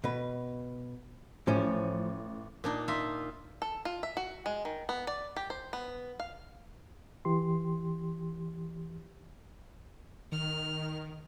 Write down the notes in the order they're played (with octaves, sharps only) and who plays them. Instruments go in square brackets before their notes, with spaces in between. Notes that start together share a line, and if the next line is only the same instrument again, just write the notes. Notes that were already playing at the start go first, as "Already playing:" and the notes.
[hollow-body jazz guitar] B2 B4
[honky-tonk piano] A1 [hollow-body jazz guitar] F3 C#4
[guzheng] A#2 D4 D#4
D#4 F4 E5
[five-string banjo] A4
F4
E5
F#4
G#3
D#3
B3
D5
G4
C5
B3
F5
[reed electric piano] E3 G4 C6
[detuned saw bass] D#3 [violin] F6